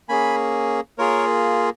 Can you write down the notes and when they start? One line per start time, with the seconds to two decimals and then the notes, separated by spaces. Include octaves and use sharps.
0.09 A#3 C#4 G#4 G#5 B5
0.98 A#3 F4 G#4 A#4 C#5